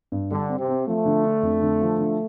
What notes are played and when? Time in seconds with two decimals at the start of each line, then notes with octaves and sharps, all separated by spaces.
0.12 G2
0.31 D3 G3
0.49 C4
0.59 C3
0.68 C4
0.87 F3 A3
1.06 D3
1.24 D4
1.43 F2
1.62 D3
1.81 F3
1.99 D3